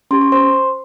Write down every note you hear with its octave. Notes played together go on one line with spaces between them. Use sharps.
C#4 G4 C6
C#6
C5 C6